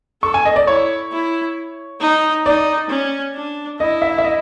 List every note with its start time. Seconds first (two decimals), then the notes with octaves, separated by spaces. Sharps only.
0.23 A4 C#6
0.34 G#5
0.45 D#5
0.56 D5
0.67 E4 C#5
1.12 E4
2.01 D#4
2.46 D#4 D5
2.90 C#4
3.35 D4
3.80 E4 D#5
4.02 E5
4.18 E5
4.24 D#5